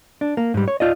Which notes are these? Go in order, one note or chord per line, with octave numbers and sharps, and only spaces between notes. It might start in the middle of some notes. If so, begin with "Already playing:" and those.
D4
A#3
G#2 G3
C#5
F4 D5 D#5